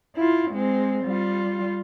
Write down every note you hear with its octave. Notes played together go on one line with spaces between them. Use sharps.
E4 F4
G#3 C4
G3 F4